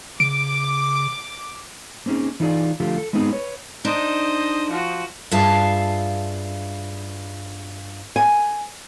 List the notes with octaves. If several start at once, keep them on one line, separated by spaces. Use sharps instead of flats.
C#3 D6 D7
A#3 C4 C#4 D#4 G#4
E3 D#4 F4 G#4 D5
D3 F3 A3 F4 G4
A4
G#3 B3 C4 D#4 G4 G#4
B4 C#5
D4 D#4 C5 D#5
F3 F#4
G2 F4 G#4 E5 F5 A5
G#5